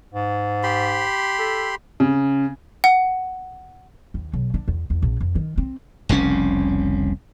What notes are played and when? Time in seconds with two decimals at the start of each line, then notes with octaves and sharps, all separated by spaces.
0.13 G#2
0.63 G4 B5 C6
1.39 A4
2.00 C#3
2.84 F#5
4.14 D#2
4.33 B1
4.54 D4
4.68 E2
4.90 E2
5.02 A#1
5.20 F2
5.35 D#3
5.58 C4
6.09 F1 C2 C#3 C#4